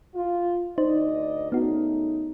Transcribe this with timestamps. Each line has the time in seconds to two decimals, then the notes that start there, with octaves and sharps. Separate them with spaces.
0.16 F4
0.78 D2 D#4 C5 D5 D#5
1.52 C#3 A3 B3 D#4 F#4